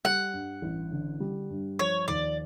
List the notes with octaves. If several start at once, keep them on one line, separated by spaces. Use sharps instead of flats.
G3 F#5
G2
A1
D3
G3
G2
F3 C#5
D#2 D5